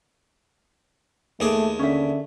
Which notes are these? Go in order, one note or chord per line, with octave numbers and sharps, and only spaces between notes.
D#2 A3 G#4 D6
D3 C#4 E5